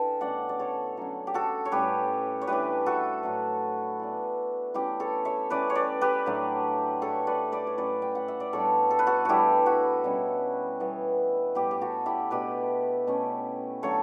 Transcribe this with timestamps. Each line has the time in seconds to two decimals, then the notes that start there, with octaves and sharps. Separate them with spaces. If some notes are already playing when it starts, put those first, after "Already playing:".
Already playing: E3 D4 A4 E5 G5
0.20 B2 A3 C#4 D5 F#5
0.49 D5
0.59 A4 C#5
0.97 D3 F#3 A3 C#4
1.27 G4
1.34 F#4 A4
1.65 C#5
1.72 A2 G3 C#4 G4 B4
2.42 C#5
2.47 E3 A3 D4 G4 B4
2.86 F#4 A4
3.23 A2 F#3 A3 D4
3.99 E3 B3 D4
4.74 E3 A3 C#4 E4 G4
5.00 A4 C#5
5.25 C#5 E5
5.50 E3 A3 C#4 B4 D5
5.70 C#5
5.75 B4 D5
6.01 G4 B4
6.26 A2 F#3 A3 D4
7.01 A2 E3 A3 A4 C#5
7.27 B4 D5
7.52 B4 D5
7.67 C#5
7.77 A2 F#3 C#4 B4 D5
8.02 G5
8.15 F#5
8.28 E5
8.40 D5
8.53 A2 G3 B3 D4 A4 C#5
8.91 A4
8.99 B4
9.07 F#4 A4
9.25 A2 E3 G3 D4 E4 F#4 G4
9.66 F#4
10.04 B2 G3 C#4
10.80 E3 G3 B3
11.55 A2 G3 B3 G4 B4
11.71 G4
11.81 F#4 A4
12.06 E4 G4
12.31 B2 A3 D4 G4 B4
13.07 B2 A3 C#4
13.83 D3 F#3 A3 A4 C#5